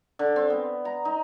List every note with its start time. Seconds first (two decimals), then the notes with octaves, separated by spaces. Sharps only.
0.19 D3
0.36 C4
0.50 B3
0.85 A#5
1.05 D#4